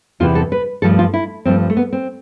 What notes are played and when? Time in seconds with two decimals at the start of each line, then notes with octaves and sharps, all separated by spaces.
0.20 E2 C3 E3 F4
0.35 A4
0.52 B4
0.82 G2 F3 A3 A4
0.99 F4
1.14 E4
1.45 G2 F3 A3 C4
1.70 A3
1.77 B3
1.93 C4